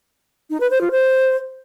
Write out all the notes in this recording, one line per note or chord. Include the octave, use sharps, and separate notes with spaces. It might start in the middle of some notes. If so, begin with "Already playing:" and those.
D#4
B4
C5
F4
C5